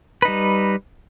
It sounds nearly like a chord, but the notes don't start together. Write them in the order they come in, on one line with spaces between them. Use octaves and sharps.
B4 D#4 G3